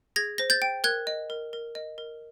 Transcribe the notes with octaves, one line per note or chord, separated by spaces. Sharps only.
G#4 G#6 A#6
C5 A#6
G6 A6
G5
A#4 F#6 G#6
D#5
A#4
A#4
D#5
A#4